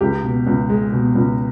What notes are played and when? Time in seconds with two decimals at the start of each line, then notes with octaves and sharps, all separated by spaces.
0.01 C#2 G4
0.24 B2
0.47 C#2
0.69 G#3
0.93 B2
1.15 C#2